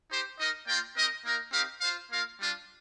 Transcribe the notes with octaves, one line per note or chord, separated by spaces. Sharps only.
D#4 G4 C5
D#4 A#4 D#5
A#3 F4 A#4 D5 G5
C4 D#4 A#4 D#5
A#3 D#4 A#4
C4 D#4 G4 A#4 F5
F4 C5 F5
A#3 F4 A#4 F5
G3 D4 F4